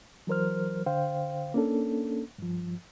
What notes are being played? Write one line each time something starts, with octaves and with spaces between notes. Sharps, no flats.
E3 F#3 A#4 C5 F6
D3 C5 F5 G5
A#3 C#4 D4 A4
G2 F3